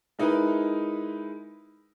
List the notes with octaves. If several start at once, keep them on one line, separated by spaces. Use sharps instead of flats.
G#3 D#4 E4 A#4 B4